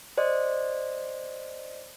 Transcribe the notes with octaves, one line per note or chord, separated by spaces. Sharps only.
C5 D5 D#5